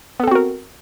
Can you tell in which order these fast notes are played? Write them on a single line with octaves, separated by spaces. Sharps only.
B3 A4 C4 F#4 A#4